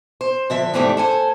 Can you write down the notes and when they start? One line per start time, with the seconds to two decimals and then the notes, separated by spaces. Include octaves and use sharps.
0.21 C5
0.50 D3 F3 E5
0.74 E2 G#2 C3 G3 A3 D4
0.97 A4 C5 G#5